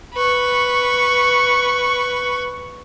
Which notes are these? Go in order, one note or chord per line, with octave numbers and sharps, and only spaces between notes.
B4 C#6